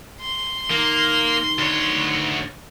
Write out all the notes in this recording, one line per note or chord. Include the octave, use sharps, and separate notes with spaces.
C6
D#3 A#3
D2 C#5